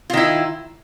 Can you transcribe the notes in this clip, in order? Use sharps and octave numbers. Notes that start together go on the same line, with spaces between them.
D#3 E4 F4